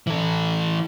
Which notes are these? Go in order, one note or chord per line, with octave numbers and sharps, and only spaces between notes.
E3 A4